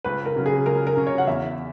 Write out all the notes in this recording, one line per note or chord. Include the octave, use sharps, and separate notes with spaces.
C#2 B4
A#4
C#3 F#3 C#4
G#4
C#2 A#4
A#4
C#3 F#3 C#4
C#5
F#5
E2 E5